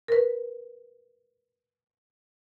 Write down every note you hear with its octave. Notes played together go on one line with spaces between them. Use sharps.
A#4 B4